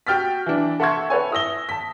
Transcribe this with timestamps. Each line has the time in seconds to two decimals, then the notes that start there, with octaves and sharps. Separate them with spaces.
0.07 F#4 G5 F6 A6 B6
0.46 E3 D4
0.80 A4 E5 F#5 C6 C#6 G#6
1.10 A4 B4 C#5 G#5
1.31 E4 D#6 E6 A#6 G7
1.69 A5 B6